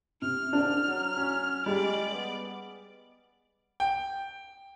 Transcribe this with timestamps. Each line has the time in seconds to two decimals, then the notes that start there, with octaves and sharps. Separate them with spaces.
0.22 C3 F6
0.53 D#2 G#2 D4
0.87 F#3
1.17 C#4
1.66 G3 G#3 D5
2.13 B3
3.80 G5